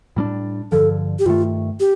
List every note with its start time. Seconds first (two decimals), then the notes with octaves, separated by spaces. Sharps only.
0.16 A2 G3 A#3 D4
0.72 G2 D3 F3 A4
1.19 G4
1.26 G2 D#3 A3 F4
1.80 G4